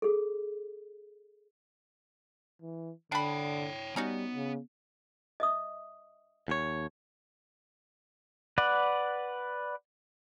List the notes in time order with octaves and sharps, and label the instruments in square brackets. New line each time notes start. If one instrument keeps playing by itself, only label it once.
[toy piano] G#4 A4
[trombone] E3
[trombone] D3 [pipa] D4 B5 [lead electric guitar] C#5 G5
[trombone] G3 [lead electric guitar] B3 [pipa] C#4 D#4 F#4
[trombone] C#3
[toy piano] D#5 E5 D#6
[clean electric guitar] D#2 C#5
[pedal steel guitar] B4 D5 F#5